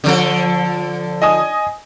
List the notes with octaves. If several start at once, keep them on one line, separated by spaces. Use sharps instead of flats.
D3 F3 A4
D#5 G#5 D#6